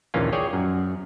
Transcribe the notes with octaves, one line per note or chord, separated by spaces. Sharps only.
A#1 D#2 E3 A#3 C#4 F4
G#4 C#5 D5 G5 G#5
F#2